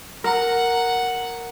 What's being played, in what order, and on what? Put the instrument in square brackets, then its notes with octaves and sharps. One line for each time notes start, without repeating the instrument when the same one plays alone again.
[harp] A#4 A#5 [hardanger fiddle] F#5